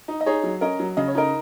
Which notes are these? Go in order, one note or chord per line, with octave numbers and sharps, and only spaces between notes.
D#4
D#5
D#4 G#4 C#5
F#3
C#4 A#4 D#5
F#3
C#3 D#5
C#5
D#4 A#4 D#5